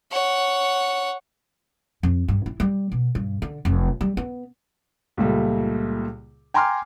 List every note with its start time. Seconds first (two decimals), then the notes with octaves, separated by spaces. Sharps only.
0.12 C#5 F#5
2.03 F2
2.28 G2
2.46 E4
2.60 G3
2.92 B2
3.15 G2
3.42 D3
3.65 F1
4.01 G3
4.17 B3
5.17 C#2 A#2 G3 A3
6.54 G5 G#5 A#5 C6 D6 F6